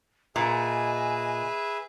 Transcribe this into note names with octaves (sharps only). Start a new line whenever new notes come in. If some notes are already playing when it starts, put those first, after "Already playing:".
A#2 G#4 B4 D#5 E5 G#5